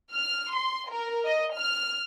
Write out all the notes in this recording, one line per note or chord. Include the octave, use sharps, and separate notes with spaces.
F6
C6
A#4
D#5
F6